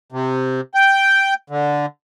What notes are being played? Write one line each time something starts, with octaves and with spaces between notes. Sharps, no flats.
C3
G5
D3